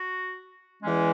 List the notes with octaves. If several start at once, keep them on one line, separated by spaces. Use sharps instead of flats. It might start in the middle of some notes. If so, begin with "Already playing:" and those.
Already playing: F#4
E2 E3 G#3 C#4